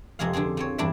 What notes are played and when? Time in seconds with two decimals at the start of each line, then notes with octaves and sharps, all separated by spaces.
0.19 F2 C3 G#3 G#4 F5
0.33 D3 D4 F4 G#4
0.57 F3 C4 C#5
0.78 E2 G2 D4 E4 D5 E5